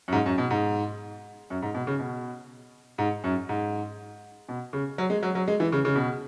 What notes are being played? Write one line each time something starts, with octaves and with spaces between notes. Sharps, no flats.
F#2
G#2
F#2
B2
G#2
F#2
G#2
B2
C#3
B2
G#2
F#2
G#2
B2
C#3
F#3
G#3
F#3
F#3
G#3
E3
C#3
C#3
B2